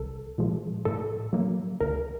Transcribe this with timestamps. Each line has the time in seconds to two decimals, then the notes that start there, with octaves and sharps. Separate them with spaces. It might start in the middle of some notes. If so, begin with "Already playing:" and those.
Already playing: C2 A4
0.38 A#2 F3 G#3
0.85 A2 A4
1.33 F#3 A#3
1.81 D2 A#4